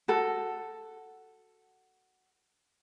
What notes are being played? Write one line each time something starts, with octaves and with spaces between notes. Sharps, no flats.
F#4 A4